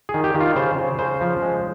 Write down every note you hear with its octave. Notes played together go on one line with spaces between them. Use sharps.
G#4
D#3
G4
D#3
F4
C#3 C5
C#3
C#3 C5
F3
G#3